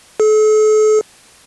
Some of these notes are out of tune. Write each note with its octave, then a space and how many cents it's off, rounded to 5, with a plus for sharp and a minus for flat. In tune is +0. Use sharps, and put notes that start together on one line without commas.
A4 -40